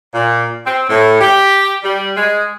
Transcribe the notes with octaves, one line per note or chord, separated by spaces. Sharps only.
A#2
C4
A2
G4
G3
G#3